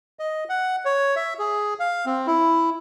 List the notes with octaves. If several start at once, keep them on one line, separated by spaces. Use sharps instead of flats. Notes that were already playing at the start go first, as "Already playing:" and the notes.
D#5
F#5
C#5
E5
G#4
F5
C4
E4